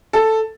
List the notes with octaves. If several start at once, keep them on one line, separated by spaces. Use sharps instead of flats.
A4